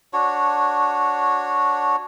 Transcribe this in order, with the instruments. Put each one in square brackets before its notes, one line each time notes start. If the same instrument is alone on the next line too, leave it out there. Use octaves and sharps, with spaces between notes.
[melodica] D4 F#4 C#5